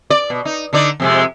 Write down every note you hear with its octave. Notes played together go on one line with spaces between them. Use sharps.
D5
B2
D#4
D3 D#4 D5
F2 C3 G#3